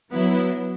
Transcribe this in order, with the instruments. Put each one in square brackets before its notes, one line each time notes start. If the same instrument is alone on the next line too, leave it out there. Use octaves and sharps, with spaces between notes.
[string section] F#3 B3 E4